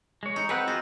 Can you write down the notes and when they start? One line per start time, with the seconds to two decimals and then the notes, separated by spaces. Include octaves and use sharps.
0.23 G#3 C#5
0.36 D#4
0.49 C4 G#4 B4 F#5
0.68 F4 F#4 G#4 D#5